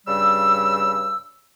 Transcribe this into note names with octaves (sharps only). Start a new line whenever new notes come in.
G2 C#3 G3 E6